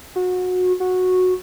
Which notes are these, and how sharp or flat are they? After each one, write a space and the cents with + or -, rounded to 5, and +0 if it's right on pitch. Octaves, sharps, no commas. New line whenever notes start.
F#4 -25
F#4 -10